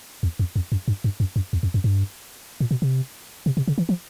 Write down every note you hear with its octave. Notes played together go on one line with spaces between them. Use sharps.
E2
F2
F2
F#2
G2
G2
F#2
F#2
E2
F2
F#2
G2
A#2
B2
C3
C3
C3
C#3
E3
F3